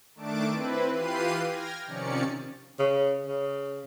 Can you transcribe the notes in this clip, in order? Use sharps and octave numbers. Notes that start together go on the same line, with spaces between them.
D#3 A3 D4 A5 D6 D7
C4 E4 B4
E3 F4 G4 B4 C7 D#7
G5 F6 G#6 A#6
C3 D#3 F3 C#4 D5 C#7
C#3
C#3